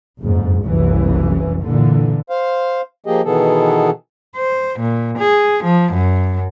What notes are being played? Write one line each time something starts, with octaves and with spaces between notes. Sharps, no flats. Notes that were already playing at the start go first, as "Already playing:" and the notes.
F#1 F2 G#2
F#1 C2 F#2 E3
A#2 D3 E3
C5 F5
F3 A#3 G4 G#4 D#5
B2 D#3 E3 B3 G#4 A4
C5
A#2
G#4
F3
F#2